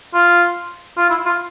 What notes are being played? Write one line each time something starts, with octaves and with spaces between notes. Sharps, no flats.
F4
F4
E4
F4